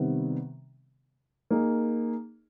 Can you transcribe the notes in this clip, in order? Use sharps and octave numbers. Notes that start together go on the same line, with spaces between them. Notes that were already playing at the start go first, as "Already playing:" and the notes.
Already playing: C3 D#3 G3 B3
A#3 D#4 G#4